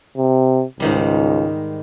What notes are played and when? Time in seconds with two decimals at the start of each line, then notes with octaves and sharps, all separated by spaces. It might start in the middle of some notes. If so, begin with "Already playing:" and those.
0.17 C3
0.80 C#2 G#2 D#3 G3